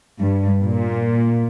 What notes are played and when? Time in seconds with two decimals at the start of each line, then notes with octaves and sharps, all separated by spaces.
0.19 G2
0.61 A#2